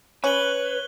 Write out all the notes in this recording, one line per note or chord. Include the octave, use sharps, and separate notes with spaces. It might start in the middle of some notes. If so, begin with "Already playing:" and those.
C#4 B4 C#5 F#6 F#7 G7